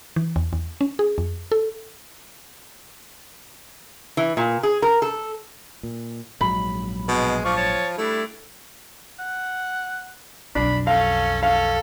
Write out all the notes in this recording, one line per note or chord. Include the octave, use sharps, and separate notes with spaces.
E3
E2
E2
C#4
G#4
F2
A4
E3
A#2
G#4
A#4
A4
A#2
A#1 G#2 F#3 B5
B2 G#3
F3 D5 F5 C#6
C#5 A5
G3 A3 D4 E4
F#5
B1 F2 D4 B5
C#4 A4 F5
C#4 A4 F5